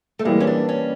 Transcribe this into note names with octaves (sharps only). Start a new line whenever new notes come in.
A3
E3 G3 G#3 A#3
C#4
D4
C#4